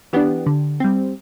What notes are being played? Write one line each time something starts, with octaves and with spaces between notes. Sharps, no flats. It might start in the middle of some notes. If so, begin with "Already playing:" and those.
E3 B3 D4 G4
D3
G3 C4